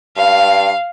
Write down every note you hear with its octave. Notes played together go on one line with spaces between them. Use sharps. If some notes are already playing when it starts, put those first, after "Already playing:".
G2 F5